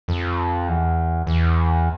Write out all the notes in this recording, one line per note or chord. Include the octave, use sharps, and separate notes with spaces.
F2
E2
E2